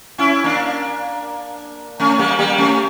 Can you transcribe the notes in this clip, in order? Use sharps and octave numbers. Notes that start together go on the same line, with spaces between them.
C#4 E4
A#3 D4
A3 C#4
G3 A#3
G3 A#3
A3 C#4